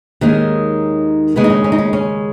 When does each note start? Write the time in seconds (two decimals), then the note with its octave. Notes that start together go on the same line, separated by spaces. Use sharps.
0.21 D#2 D#3 G#3 C#4
1.36 D#2 C#3 G#3 B3
1.44 D#4
1.50 C#4
1.64 C#4
1.72 D#4
1.78 C#4
1.93 C#4